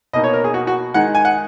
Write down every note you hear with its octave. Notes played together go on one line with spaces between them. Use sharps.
B2 A#3 D#4 D#5
C#5
A#4
G#4
F#4
F#4
D#3 G#3 D#4 F#5
G#5
F#5